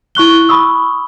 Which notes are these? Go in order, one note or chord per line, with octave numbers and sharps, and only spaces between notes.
E4 C#6 F#6 G7
B5 C#6 D#6 E6